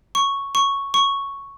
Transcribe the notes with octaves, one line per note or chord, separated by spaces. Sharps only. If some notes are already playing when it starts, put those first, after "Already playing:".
C#6
C#6
C#6